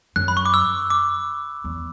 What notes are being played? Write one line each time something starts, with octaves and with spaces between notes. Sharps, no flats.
F#2 F#6
B5
C#6
D6
E6
D6
E2